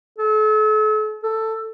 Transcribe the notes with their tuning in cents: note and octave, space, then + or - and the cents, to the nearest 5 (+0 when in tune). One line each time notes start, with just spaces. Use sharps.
A4 -40
A4 +10